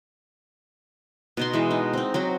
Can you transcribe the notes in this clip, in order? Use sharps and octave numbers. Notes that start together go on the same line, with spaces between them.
B2 D#4 C6
E3 G#3 E5
D#4
C4 D#4
F#3 C4 F#4